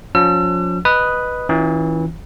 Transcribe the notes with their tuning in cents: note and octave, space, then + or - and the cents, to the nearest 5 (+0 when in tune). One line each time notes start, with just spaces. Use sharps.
F3 +30 C#4 +30 E6 +40
B4 +0 D#5 -5 D#6 +0
E3 -25 C#4 +0 F4 +0